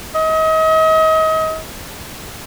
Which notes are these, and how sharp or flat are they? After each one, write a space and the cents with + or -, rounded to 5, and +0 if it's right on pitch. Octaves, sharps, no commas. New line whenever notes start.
D#5 +35